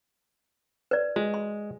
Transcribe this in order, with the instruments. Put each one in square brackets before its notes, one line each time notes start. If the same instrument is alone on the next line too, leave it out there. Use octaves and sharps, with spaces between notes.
[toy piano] B4 D5
[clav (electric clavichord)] G#3 [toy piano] F#4
[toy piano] C6